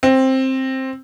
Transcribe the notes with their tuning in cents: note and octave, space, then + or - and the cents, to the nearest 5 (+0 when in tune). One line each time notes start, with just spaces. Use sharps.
C4 +10